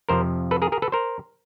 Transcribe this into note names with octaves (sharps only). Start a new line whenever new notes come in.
F2 C3 F3 A#4 C5
A4 B4
G#4 A#4
G#4 A#4
A4 B4
A#4 C5